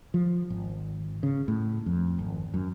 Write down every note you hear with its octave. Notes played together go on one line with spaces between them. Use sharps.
F3
G#1
C#3
A2
F2
G#1
F#2